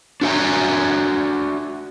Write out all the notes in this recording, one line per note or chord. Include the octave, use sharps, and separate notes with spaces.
D4 F#4 E5 G#5 A#5